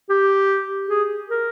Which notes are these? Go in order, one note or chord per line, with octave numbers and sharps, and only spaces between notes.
G4
G#4
A#4